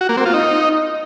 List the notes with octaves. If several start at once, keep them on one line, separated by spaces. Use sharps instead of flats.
F#4
A#3
C4
F4
D#4